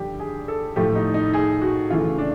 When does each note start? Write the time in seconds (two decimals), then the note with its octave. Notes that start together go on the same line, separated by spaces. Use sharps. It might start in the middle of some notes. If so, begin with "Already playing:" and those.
Already playing: G2 D3 F3 G4
0.19 G#4
0.48 A4
0.76 A2 F3 A3 G4
0.95 D#4
1.14 D#4
1.33 G#4
1.62 F#4
1.90 C#3 E3 A3 F4
2.18 D4